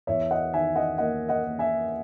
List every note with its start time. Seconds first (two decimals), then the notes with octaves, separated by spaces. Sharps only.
0.07 E2 C#5 E5
0.31 D#5 F#5
0.53 D#3 E5 G#5
0.75 D#5 F#5
0.98 A#3 D#5 F#5
1.29 D#5 F#5
1.44 A#3
1.59 E5 G#5